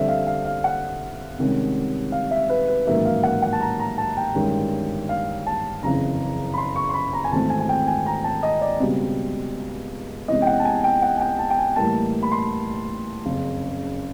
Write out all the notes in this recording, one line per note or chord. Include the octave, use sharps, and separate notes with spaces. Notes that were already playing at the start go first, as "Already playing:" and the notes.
Already playing: F2 D3 G3 C4 E5
F5
F5
F5
F#5
C2 C3 D#3 G#3 C#4
F5
E5
B4
B4
A1 G#2 D#3 F#3 A#3 E5
F5
F#5
F#5
A5
A#5
A#5
A5
G5
G1 G2 D#3 G#3 C#4
F5
A5
F#1 F2 C#3 E3 A#5
B5
C6
C#6
C6
B5
A#5
G#5
G#1 G#2 E3 A3 C4 A5
G#5
G#5
G5
G#5
A#5
A5
D#5
D5
C#2 B2 G3 C4
E2 C3 E3 G#3 C#4 D#5
G5
F#5
A5
G#5
G5
F#5
G#5
G5
A5
G5
G#5
A2 E3 G3 A#3 A5
B5
C6
F#1 F2 C#3